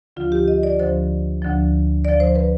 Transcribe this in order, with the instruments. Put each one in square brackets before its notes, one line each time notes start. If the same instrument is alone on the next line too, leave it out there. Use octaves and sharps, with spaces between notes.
[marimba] D2 D3 F3 F4
G4
D#5
D5
D2 D3 F3 C5
D2 D3 F3
D2 D3 F3 D5
C5
B4